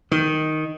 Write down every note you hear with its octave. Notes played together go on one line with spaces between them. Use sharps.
D#3